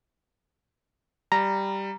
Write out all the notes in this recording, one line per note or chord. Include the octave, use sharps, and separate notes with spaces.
G3 A#5